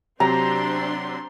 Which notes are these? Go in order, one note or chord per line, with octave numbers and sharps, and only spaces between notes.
C3 F#3 C4 D4 G4 A#5 C6